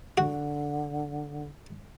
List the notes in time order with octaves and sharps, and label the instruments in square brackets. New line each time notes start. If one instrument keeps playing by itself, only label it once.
[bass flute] D3 [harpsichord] F#4